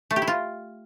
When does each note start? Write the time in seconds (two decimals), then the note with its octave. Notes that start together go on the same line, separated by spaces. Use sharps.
0.11 A3
0.16 G4
0.22 E4
0.28 F4